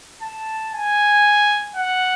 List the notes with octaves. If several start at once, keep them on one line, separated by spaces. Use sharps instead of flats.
A5
G#5
F#5